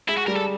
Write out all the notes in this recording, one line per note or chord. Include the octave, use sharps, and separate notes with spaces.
G#3 E4
F#4
G3 A#4
A4